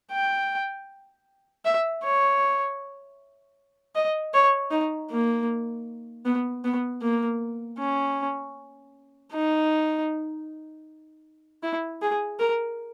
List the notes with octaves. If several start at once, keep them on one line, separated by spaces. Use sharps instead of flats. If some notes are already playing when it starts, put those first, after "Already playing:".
G5
E5
C#5
D#5
C#5
D#4
A#3
B3
B3
A#3
C#4
D#4
E4
G#4
A#4